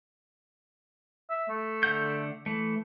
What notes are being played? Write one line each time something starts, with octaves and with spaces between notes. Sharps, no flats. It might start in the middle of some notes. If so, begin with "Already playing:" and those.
E5
A3
D3 F#5 G6
E3 A3